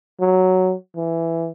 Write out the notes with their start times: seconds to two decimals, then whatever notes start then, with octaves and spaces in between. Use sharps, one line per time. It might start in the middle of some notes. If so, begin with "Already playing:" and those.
0.20 F#3
0.96 E3